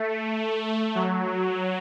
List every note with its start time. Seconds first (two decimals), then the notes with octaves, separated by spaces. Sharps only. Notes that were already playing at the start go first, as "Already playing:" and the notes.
Already playing: A3
0.95 F#3